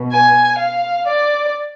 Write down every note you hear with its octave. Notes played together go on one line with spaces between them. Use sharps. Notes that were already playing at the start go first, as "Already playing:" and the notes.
Already playing: B2
G#5
F5
D5